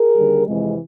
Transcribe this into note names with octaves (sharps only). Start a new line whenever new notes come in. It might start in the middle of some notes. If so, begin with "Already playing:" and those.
Already playing: G#4 A#4
D#2 D3 G3
F2 C3 E3 G#3